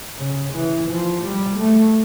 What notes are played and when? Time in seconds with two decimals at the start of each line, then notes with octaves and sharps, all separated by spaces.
0.19 C#3
0.53 E3
0.88 F3
1.22 G3
1.57 A3